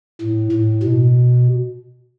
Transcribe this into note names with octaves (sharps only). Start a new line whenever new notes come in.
A2
A2
B2